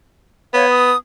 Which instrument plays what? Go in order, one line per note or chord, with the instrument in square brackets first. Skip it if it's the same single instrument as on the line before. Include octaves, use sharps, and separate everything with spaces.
[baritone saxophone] B3 [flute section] C#5 F5
[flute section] D#6